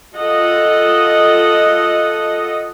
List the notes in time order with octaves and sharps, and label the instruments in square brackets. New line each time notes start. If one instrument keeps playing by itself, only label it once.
[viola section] F4 A4 D#5 F#5